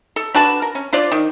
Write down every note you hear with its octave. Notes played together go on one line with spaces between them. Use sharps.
A4
D4 F#4 B4 A5
A#4
C#4
D4 F4 C5 D5
D#3